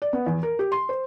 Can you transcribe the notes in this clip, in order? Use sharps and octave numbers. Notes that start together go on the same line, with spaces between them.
D5
B3
E2
A#4
G4
C6
C5